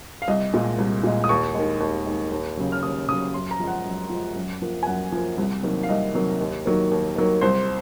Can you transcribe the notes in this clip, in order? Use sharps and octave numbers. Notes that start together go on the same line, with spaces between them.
F5
C2 D#5
A#2 G#3
C2
A#2 G#3
D#6
D#2 C#6
D#3 G#3
D#2
D#3 G#3
D#2
C#3 F#3
F6
D#2 D#6
C#3 F#3 D#6
F#2 C6
A#5
F3 G#3
F#5
F#2
F3 G#3
F#2
F3 A#3
G#5
F#2 F#5
F3 A#3
C2
C3 D#3 F#3 A#3
F5
C2 D#5
C3 D#3 F#3 A#3
D#2
D#3 F#3 A#3
D#2
D#3 F#3 A#3
C2 C5